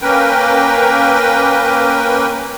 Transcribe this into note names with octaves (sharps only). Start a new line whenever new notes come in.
A#3 C#4 A#4 B4 G5